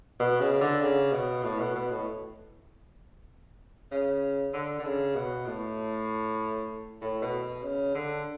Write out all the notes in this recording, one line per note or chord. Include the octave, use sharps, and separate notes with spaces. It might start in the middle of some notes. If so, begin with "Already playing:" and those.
B2
C#3
D3
C#3
B2
A2
B2
B2
A2
C#3
D3
D3
C#3
B2
A2
A2
B2
B2
C#3
D3